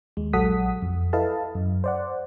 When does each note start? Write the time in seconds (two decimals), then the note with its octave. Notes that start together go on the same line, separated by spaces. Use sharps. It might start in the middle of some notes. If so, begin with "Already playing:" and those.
0.17 D#2 G#3
0.33 A#1 F#3 A4 F#5 D#6 B6
0.82 F2
1.13 E4 A4 B4 D#5 F5 A5
1.55 F#2
1.84 C5 D5 F#5